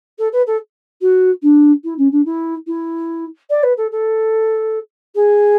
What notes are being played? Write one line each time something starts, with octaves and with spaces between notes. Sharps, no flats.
A4
B4
A4
F#4
D4
E4
C#4
D4
E4
E4
D5
B4
A4
A4
G#4